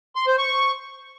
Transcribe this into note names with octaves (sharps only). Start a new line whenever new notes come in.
C6
C5
C#6